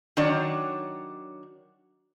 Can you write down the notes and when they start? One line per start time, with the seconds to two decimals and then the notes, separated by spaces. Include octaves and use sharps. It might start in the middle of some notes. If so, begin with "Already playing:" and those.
0.17 D#3 F#3 D4 C#5